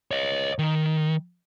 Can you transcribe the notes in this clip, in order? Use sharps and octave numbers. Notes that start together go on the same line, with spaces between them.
C#5 D#5
D#3